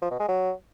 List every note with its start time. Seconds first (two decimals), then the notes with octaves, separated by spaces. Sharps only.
0.02 F3
0.11 B2
0.20 G#3
0.29 F#3